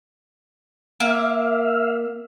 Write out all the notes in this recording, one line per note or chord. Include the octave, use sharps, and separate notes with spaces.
A#3 E5 F5